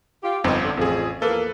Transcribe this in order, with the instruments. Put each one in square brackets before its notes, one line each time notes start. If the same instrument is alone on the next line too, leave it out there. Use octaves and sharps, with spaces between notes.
[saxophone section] F4 G4
[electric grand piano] G1 F2 C4 [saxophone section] G3 B3 D#4
[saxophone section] D3
[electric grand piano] A1 G#4 [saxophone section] F2
[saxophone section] E2 F3 A#3 [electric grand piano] A4 B4